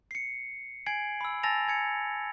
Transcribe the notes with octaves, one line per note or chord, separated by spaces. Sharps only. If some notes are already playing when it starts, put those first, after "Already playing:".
C7 C#7
G#5 G#6 C7 D7 F#7
B5 E6
G#5 A5 E6 A6 A#6 F7
G#5 G#6 C#7